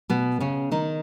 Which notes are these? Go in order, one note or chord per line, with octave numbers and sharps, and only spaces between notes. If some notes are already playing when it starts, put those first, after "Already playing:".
B2 B3
C#3 C#4
D#3 D#4